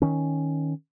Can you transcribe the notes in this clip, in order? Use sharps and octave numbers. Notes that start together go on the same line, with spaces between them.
D#3 C#4